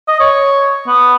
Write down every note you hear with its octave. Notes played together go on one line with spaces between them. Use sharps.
D#5
C#5
B3